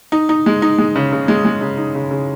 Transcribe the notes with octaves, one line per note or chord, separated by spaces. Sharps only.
D#4
D#4
G#3
D#4
G#3
C#3
C#3
G#3
G#3
C#3
D#4
C#3
C#3